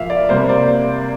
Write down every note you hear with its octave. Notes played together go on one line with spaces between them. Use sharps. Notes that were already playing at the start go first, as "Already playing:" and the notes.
Already playing: A#2 F3 A#3 E5 F5
D5
C3 G3 A#3 C5
D5